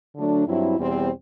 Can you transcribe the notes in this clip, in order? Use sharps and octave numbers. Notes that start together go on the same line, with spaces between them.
D3 F#3 A3 D4
G2 F#3 C4 E4
E2 B2 G3 C4